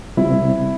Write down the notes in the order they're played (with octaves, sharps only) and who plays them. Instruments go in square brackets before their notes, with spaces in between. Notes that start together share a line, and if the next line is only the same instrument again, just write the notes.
[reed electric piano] C3 G3 C4 [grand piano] E4